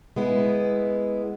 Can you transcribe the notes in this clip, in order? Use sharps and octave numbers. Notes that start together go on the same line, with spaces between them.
G#3 B3 E4